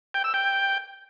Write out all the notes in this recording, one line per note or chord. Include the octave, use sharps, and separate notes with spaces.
G5
E6
G5